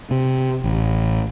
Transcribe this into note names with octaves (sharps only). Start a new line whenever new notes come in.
C3
A1